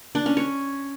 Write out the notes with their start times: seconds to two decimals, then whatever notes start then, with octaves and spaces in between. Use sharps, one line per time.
0.15 D4
0.26 C#4
0.37 C#5